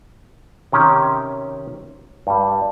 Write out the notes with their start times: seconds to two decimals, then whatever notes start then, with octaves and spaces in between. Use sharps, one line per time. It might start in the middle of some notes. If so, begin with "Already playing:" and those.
0.72 C3 D#3 C#4 G4
2.27 G2 G3